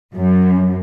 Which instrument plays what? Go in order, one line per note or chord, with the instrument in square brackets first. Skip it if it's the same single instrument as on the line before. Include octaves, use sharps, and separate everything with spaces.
[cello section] F#2